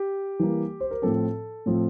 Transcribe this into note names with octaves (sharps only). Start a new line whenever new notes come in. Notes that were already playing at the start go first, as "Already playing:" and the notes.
Already playing: G4
E3 G3 A#3
C5
A#4
A2 F3 C4 A4
A2 F3 C4